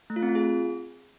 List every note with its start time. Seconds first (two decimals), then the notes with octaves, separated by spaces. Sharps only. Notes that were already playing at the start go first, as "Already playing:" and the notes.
0.10 A3
0.16 F4
0.23 C4
0.29 F4
0.35 G#4